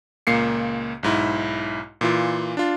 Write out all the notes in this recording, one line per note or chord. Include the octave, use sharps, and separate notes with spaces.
C#2 A#2 A#3 C7 C#7
B1 G#2 E4
A#2 E3 F4
D4 F4